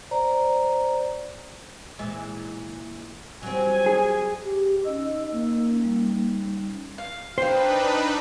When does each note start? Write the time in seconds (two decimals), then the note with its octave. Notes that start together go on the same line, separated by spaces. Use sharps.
0.11 C5 D5 A#5
1.99 A#2 E3 G#3
3.43 F#3 G3 C4 G#5
3.86 G#4
4.44 G4
4.84 C#4 D#4 D#5 E6
5.33 A#3
5.84 G3 C#4 D#4
6.98 F5
7.38 D4 D#4 B4 C5 F5 G5